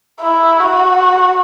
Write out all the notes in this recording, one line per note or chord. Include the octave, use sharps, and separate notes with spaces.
E4
F#4